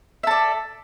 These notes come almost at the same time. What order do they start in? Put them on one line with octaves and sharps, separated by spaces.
E5 A4 D5